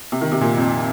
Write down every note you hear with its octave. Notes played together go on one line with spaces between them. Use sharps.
C3
D#3
C3
A#2
F2